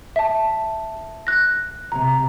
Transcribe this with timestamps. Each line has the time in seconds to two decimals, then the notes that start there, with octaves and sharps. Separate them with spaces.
0.16 E5 A5
1.27 F#6 A#6
1.92 C3 A#5